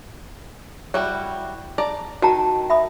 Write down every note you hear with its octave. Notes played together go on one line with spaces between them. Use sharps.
G3 E4 F#4
D5 A5 A#5
D#3 F#4 A5 A#5
E5 B5 D#6